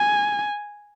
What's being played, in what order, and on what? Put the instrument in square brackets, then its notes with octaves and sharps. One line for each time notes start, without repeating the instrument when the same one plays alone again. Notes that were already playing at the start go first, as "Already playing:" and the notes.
Already playing: [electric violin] G#5